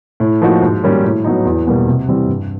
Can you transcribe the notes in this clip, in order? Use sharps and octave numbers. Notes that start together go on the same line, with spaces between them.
A2
F3 A#3 D#4 F#4
G#2
D#3 G3 A#3 C#4
A2
F#3 B3 D#4
E2
B2 G3 A#3
C3
E3 G3 C4
G2